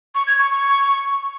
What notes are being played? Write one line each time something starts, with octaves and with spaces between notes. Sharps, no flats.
C#6
G#6
C#6
C#6